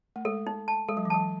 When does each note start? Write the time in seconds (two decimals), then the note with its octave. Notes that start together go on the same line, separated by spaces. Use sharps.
0.16 A3
0.25 G#3 A4
0.47 D#4
0.68 A5
0.88 G#3 A4
0.97 F#3
1.05 E3
1.10 F#3 A5